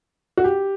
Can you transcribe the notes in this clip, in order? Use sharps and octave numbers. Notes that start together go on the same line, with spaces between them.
F#4
G4